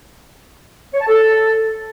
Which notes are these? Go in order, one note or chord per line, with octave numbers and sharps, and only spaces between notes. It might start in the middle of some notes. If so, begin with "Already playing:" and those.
C#5
A5
A4